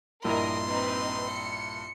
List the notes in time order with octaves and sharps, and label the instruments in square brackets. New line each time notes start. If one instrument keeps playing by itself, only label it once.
[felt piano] A#1 G2 E4 [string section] A#4 D#5 [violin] C6
[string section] C4 D#4 B4
C#7